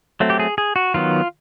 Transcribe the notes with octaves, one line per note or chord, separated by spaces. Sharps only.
F#3 A3 C4
G4
G#4
G#4
F#4
D#3 F#3 B3 F4